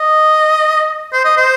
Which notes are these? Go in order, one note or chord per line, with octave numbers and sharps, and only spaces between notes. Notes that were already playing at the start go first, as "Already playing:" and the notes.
Already playing: D#5
C5
D#5
C5